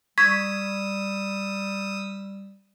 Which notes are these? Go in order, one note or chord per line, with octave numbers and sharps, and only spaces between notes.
G3 C#6 D#6 E6 G#6 B6